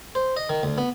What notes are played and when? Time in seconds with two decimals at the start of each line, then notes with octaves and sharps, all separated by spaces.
0.15 C5
0.37 D#5
0.49 D#3
0.63 D2
0.78 B3